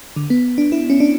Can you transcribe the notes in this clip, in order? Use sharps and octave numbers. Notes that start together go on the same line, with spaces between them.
D3
B3
D4
E4
C#4
D4